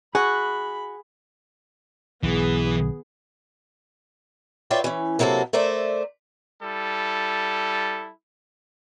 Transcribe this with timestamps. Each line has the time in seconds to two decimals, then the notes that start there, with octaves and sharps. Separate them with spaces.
0.15 F#4 G#4 B5
2.23 B1 G#2 E3 B3 G#4
4.70 F4 B4 C#5 D5 E5 G5
4.84 E3 C#4
5.19 C3 F#3 A#3 B3 A4
5.53 A3 A#4 C5 D5 E5
6.62 G3 E4 A4